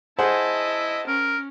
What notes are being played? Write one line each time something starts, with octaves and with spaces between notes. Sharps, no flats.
E4 G#4 C5 D#5 F#5 A5
C#4 A#4